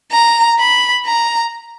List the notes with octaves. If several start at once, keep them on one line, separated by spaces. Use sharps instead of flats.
A#5
B5
A#5